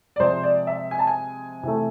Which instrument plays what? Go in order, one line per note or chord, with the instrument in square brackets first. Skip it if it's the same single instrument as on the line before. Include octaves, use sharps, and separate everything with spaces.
[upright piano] D5
C3 F3 G#3 C5
D5
E5
G#5
A5
G#5
C3 E3 A3